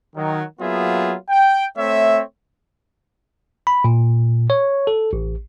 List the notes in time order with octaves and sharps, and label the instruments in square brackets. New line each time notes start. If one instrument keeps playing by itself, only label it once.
[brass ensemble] D#3 F#3
F#3 A#3 B3 F4 G#4 E5
G5
A3 C4 C#5 E5
[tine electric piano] B5
A#2
C#5
A4
A1